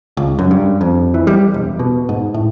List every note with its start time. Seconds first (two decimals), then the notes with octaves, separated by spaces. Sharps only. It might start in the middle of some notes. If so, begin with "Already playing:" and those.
0.17 C#2
0.39 F#2
0.51 G2
0.81 F2
1.14 E3
1.27 G3
1.54 E1
1.79 B2
2.09 G#2
2.34 A2